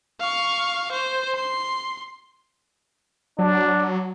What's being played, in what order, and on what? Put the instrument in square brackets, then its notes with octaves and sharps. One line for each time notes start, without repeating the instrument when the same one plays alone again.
[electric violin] F5 C#6
C5
C6
[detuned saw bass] F#3 [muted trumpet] D4